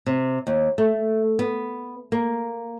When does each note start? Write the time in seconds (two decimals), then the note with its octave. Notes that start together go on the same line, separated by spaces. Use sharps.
0.06 C3
0.47 D#2
0.78 A3
1.39 B3
2.12 A#3